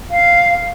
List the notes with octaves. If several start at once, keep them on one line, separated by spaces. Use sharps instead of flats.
F5